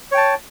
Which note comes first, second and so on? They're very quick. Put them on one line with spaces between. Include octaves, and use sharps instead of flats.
C#5 G5 A5